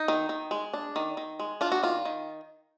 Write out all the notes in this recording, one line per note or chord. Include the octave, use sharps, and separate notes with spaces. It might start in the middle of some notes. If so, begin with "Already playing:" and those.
Already playing: D#4
D#3
D#3
G#3
D4
D#3
D#3
G#3
D4 F4
F#4
D#3 F4
D#3